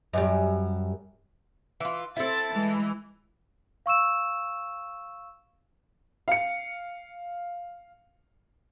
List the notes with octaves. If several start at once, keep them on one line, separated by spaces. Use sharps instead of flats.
F#2 G3
E3 F4
C4 E4 A4 A6
E3 G#3
F5 C#6 E6 E7
F5 C#7